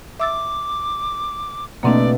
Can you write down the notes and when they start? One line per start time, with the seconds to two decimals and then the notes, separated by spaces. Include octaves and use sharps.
0.20 E5 D6 E6 A6
1.83 B2 A3 A#3 C4 D4 D5